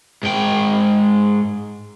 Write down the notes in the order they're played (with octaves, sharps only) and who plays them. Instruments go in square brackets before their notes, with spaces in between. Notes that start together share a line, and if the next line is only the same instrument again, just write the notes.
[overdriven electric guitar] G#2 G5